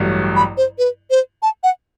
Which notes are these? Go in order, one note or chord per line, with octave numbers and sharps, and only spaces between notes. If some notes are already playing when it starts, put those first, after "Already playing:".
Already playing: A1 G2 F#3 A3
B5
C5
B4
C5
A5
F#5